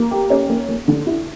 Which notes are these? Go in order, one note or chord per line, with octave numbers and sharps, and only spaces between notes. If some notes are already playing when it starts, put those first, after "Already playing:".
Already playing: A#3
G4
C#4
A#3
A#3
D3
E4